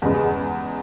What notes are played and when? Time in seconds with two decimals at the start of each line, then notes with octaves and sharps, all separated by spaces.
0.02 E2 C#3 G#3 B3